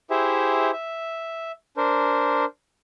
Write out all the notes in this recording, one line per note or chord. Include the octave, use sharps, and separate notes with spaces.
E4 G4 G#4 C5 E5
E5
D4 A#4 C5